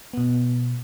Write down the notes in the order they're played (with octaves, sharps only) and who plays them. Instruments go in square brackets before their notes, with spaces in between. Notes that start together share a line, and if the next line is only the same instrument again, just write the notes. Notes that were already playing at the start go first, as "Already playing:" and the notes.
[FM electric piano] B2 B3